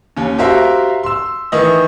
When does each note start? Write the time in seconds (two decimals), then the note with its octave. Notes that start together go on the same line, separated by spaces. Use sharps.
0.16 D#2 C#4
0.38 F#4 G4 A#4 C5 E5 F5
1.03 C6 E6
1.52 D#3 E3 D#5